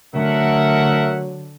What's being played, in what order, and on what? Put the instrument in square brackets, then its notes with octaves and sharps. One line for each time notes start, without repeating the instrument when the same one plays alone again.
[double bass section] D3 [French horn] F#3 [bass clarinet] A3 [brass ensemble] A#4 E5 F#5